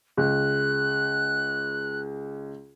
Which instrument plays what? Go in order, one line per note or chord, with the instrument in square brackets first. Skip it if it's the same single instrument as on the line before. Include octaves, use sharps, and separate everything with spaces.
[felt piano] C#2 [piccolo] F#6